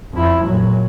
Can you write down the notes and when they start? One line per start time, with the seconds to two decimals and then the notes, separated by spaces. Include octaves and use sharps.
0.13 F2 E4
0.45 A#2 F#3